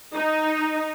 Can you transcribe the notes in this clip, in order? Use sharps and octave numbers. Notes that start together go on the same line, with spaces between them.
D#4